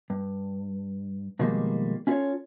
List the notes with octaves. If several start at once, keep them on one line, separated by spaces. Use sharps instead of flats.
G2
B2 D#3 F3 G3 G#3 A#3
C#4 E4 F4 G#4 A4 C#5